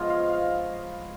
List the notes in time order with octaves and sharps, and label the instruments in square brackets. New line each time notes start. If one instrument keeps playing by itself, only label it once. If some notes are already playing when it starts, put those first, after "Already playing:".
Already playing: [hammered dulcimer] F3 G#3 B3 F4 C#5 D#5
F5
F5